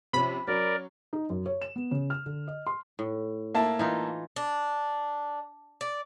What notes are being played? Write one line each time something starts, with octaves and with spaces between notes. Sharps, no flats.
C3 F3 C#4 B5
F#3 C#4 A#4 D5
D#4
F#2
C#5
E7
B3
C#3
F6
D3
D#5
C6
A2
A#3 E4 A5
E3 D#4 F4
D4
D5